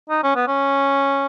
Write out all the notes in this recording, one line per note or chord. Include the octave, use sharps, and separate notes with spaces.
D#4
C#4
B3
C#4